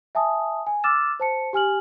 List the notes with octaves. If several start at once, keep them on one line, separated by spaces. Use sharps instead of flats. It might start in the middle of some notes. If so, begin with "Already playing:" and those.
E5 G#5 A5 D#6
G#5
D6 E6 F6 A6 E7
C5 A5 C#7
G4 G#5 F6 F#7